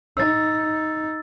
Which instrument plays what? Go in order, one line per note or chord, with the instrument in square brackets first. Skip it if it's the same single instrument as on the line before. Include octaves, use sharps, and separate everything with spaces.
[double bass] D#4 [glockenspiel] E6 A6